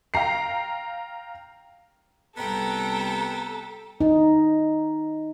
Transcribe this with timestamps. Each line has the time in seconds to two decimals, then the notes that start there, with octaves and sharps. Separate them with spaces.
0.14 F5 G5 A#5 C7
2.37 C2 B3 A4 G5 A#5
4.01 D#4